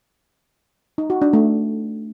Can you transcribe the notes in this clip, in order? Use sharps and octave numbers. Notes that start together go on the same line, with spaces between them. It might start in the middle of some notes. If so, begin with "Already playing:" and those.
D#4
F#4
D4
A3